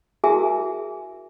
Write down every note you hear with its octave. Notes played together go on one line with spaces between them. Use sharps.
E4 F#4 G#4 A#4 E5 G#5